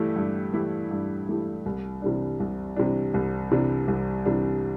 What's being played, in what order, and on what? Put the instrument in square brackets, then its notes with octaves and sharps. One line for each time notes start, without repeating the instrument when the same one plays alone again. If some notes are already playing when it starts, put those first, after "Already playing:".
Already playing: [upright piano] G2 E3 A3 E4 G4
G2
E3 A3 E4 G4
G2
E3 A3 E4 G4
C2
C3 E3 G3 D4
C2
C3 E3 G3 D4
C2
C3 E3 G3 D4
C2
C3 E3 G3 D4